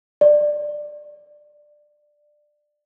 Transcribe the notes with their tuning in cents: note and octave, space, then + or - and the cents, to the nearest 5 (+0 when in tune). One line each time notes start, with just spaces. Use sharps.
D5 +15